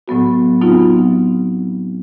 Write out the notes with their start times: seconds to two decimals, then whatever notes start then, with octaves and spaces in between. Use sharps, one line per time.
0.08 A2 F#3 B3 F#4
0.61 F#3 B3 C4 D#4 F4 F#4
0.96 B3